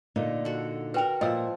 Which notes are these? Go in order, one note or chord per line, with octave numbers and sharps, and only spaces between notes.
A#2 D3 D#4
F#4 A4
F#4 A#4 B4 G5
A#2 F3 A#4 D#5 E5 E6